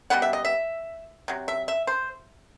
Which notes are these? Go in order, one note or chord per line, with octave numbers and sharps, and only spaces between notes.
B2 G3 B3 F#5
E5
D#5
E5
C3 F#3
E5
E5
C5